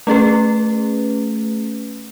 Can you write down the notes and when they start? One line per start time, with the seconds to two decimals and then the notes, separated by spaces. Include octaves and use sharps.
0.07 A3 C#4 G#4 B4